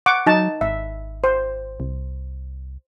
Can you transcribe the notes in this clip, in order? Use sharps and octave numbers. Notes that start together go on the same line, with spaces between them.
F#5 C#6 D6
F#3 D#4 A5
G#1 E5
C5
C2